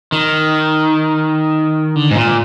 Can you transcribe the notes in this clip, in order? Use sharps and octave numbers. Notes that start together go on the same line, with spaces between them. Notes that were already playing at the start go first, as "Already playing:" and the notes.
D#3
D3
G#2
A#2